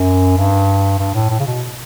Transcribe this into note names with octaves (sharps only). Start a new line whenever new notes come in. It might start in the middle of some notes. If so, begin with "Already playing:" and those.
Already playing: F#2
G2
G2
A2
A2
C#3
B2